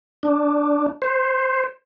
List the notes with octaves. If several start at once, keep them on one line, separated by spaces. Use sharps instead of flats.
D4
C5